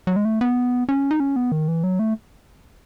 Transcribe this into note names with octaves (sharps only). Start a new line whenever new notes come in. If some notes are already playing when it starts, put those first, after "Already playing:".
F#3
G#3
A3
B3
C#4
D#4
C#4
B3
D#3
E3
F#3
A3